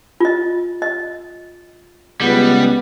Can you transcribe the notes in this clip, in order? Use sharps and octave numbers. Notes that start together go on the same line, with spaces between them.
F4 D#5
D#5
C#2 G3 B3 F#5